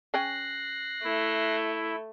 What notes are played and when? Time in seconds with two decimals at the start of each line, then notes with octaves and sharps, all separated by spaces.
0.14 C#3 C#4 G5 F#6 A#6 C7
1.04 A3 E4